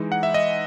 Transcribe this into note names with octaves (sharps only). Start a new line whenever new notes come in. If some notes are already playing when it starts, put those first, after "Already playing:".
Already playing: E3 G#3 D#4
F#5
E5
D#5